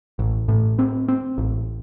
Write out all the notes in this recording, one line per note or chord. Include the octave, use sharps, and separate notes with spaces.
A1
A2
C4
C4
A1